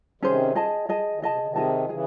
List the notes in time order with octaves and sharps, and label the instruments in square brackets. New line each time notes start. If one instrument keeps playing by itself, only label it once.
[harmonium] C3 D#3 [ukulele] C#4 G#4 C5
[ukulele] G#4 D#5 A5
G#4 D#5 A5
[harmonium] D#3
[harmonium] C#3 [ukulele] G#4 D#5 A5
[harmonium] C3
C#3
C3 D#3
[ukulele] G#4 D#5 A5
[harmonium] C#3 E3 [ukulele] G#4